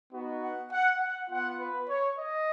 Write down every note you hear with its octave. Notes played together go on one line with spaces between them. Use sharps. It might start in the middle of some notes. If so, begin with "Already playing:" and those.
B3 D#4 F#4
F#5
F#5
F#5
B3 F4 F#5
B4
C#5
D#5